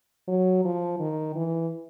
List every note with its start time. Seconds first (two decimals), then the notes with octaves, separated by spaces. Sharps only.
0.28 F#3
0.65 F3
1.00 D#3
1.35 E3